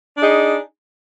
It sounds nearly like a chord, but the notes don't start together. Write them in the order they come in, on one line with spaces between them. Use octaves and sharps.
D4 G#4 D#4